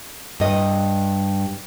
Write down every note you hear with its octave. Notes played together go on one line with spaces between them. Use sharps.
G2 D#5